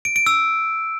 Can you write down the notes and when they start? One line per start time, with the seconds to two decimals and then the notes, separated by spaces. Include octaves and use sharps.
0.05 D7
0.16 D7
0.26 E6